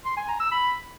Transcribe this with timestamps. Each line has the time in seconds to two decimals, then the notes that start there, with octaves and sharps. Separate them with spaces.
0.05 C6
0.17 G#5
0.28 A#5
0.40 E6
0.52 B5